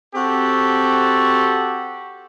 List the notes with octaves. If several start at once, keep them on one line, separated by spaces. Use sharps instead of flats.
C4 F#4 G4 A4